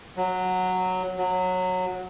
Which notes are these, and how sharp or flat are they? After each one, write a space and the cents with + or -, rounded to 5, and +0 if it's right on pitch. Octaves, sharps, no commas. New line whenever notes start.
F#3 -5
F#3 -15